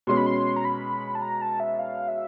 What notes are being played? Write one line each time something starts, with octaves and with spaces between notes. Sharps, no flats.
B2 G#3 C#4 C6
B5
C6
A#5
B5
A5
A#5
A5
E5
F5
E5